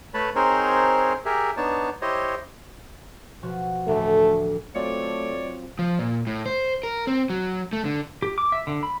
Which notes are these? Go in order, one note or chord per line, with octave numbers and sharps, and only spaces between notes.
A3 B4 C#5 A5 B5
C4 D#4 G#4 A#4 C5 C#5
G4 G#4 A#4 E5
B3 D4 D#4 C#5 A5
E4 G4 C5 C#5 D#5
B2 F3 F#4
A1 D2 A2 A3
F#3 A3 C4 F4 C#5 D5
F3
A#2
A2
C5
A#4
C4
F#3
A3
D3
G4
D6
E5
D3
B5